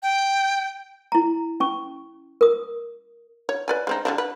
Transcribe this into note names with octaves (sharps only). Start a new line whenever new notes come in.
G5
E4 A#5
C#4 C#6
A#4 D#6
C#5
B4 D5 G#5
G#3 C4 D#4
D3 G3 D4
B4